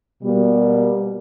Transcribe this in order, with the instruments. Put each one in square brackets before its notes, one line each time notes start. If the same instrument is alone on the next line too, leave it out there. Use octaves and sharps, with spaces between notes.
[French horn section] B2 G3 A#3